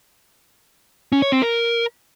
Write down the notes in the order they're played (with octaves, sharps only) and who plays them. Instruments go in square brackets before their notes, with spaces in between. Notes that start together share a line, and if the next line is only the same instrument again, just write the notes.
[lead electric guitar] C#4
C#5
C4
A#4